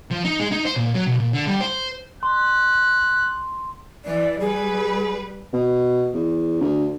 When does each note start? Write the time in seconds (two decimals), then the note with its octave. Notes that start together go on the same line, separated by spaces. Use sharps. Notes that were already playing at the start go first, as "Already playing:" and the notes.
0.11 F3
0.25 D#4
0.39 G#3
0.51 D#4
0.65 C5
0.76 A#2
0.94 F#3
1.07 B1
1.19 A#2
1.33 D3
1.47 G3
1.61 C5
2.23 C6 F#6
4.05 E3 D5
4.40 G3 G#4 B4
5.54 B2
6.14 E2
6.61 D2